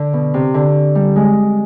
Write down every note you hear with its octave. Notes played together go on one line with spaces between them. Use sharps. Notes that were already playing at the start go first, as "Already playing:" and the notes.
Already playing: D3
B2
C3
D3
G3
G#3